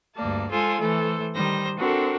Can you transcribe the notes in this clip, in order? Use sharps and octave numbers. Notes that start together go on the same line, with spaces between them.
D2 G2 A#3 D5 A5
G#3 F4 A4 C5 G#5
E3 A3 A4 C5
D#3 G3 C5 A#6
C4 D4 F#4 A4 A#4